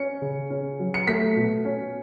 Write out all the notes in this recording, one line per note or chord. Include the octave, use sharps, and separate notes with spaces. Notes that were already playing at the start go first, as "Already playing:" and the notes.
Already playing: C#4 C#7
C#3
C#4
F#3
C#7
A3 B6
B2
C#4